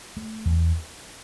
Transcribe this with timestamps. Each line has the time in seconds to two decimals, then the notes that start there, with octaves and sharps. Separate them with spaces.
0.17 A3
0.45 E2